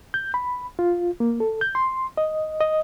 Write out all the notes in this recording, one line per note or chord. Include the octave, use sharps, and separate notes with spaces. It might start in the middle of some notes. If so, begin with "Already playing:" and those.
G6
B5
F4
A#3
A4
G6
C6
D#5
D#5